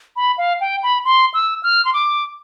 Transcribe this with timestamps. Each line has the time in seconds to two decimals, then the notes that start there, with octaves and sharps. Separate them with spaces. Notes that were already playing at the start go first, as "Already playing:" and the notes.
0.16 B5
0.38 F5
0.61 G5
0.83 B5
1.05 C6
1.34 E6
1.63 F6
1.85 C6
1.93 D6